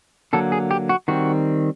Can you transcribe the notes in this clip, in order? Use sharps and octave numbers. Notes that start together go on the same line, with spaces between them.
D3 F#3 A#3 A4
G#4
G4
F#4
D#3 G3 C4 F#4